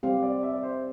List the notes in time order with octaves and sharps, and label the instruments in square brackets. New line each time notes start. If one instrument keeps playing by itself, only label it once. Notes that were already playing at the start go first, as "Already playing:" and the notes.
[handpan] G3 C4 G4 [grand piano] F5
[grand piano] D5
E5
D5
C5